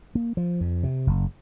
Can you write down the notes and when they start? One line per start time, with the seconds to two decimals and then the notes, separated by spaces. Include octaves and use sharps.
0.15 A#3
0.37 F3
0.61 F2
0.83 C3
1.07 F#1